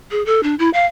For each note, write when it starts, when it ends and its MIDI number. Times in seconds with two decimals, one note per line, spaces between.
0.11 0.25 68
0.26 0.41 69
0.43 0.55 62
0.59 0.70 64
0.73 0.86 77